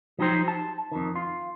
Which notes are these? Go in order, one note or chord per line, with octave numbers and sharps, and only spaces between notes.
F3 F#3 D#4 G4 C5
A5
F2 D#3
F4